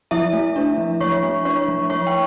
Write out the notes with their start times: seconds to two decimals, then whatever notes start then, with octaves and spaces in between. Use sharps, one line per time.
0.11 F3 E4 E5
0.33 A3
0.56 D4
0.78 F3
1.01 F3 C#5 C#6
1.23 A3
1.45 D4 C#5 C#6
1.68 F3
1.90 F3 C#5 C#6
2.07 G5